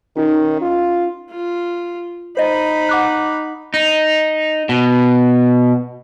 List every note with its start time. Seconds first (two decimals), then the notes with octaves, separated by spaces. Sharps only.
0.17 D#3 C#4 D#4
0.62 F4
1.30 F4
2.37 D#4 C5 D#5 B5
2.89 F#5 D6 F#6
3.74 D#4
4.69 B2